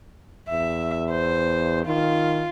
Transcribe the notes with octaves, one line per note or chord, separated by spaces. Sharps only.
E2 E5
C5
D#3 F4